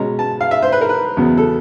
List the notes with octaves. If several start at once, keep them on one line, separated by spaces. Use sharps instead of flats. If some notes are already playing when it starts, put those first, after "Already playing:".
Already playing: B2 G#3 C#4 A#5
A5
F5
E5
C5
B4
A#4
B4
E2 C#3 F#3 B3
A4